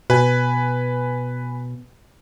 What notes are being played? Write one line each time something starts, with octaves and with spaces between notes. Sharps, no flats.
B2 B4 G#5